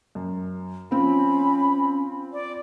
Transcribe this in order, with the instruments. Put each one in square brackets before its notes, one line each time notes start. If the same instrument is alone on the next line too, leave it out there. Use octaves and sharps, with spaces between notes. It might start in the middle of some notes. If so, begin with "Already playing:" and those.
[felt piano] F#2
[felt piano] F3 C4 F4 [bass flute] C#4 [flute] B5
[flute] D5